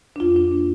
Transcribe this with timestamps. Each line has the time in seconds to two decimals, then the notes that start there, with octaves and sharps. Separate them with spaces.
0.16 D4
0.20 F2 F4
0.36 D4
0.52 A#3 D4